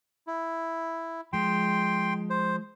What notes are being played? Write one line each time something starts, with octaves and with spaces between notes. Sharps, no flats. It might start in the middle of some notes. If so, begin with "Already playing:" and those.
E4
F3 G#3 G5 C6
C5